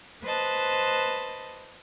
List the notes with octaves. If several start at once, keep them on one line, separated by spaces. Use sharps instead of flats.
B4 C5 D#5 A5 F#6